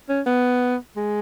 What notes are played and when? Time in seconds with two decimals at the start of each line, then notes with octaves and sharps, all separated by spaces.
0.09 C#4
0.26 B3
0.97 G#3